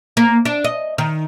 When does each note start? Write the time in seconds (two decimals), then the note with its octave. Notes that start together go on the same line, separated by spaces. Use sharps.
0.17 A#3
0.45 D4
0.64 D#5
0.98 D#3